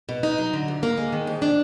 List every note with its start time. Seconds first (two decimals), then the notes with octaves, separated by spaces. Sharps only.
0.09 B2
0.23 D#4
0.38 F#3
0.53 D3
0.68 D2
0.83 A#3
0.98 G#3
1.13 D#3
1.27 F2
1.42 D4